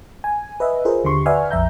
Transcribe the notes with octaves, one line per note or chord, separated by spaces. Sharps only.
G#5
B4 D#5 E5
F4 G#4 A#4 C5
D#2 D3 G4 C6 C#6
B4 D5 E5 F#5 G#5 F6
A#1 F2 E5 A#5 G6